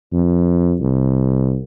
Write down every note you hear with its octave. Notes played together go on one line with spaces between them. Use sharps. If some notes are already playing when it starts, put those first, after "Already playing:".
F2
C2